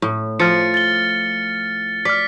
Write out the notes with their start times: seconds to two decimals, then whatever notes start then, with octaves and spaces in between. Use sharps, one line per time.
0.02 A2
0.39 F3 F6 A6 C#7
0.74 A6 G7
2.05 D5 F6 B6